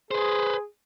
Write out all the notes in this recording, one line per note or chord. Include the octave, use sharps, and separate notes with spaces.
G#4 B4 C5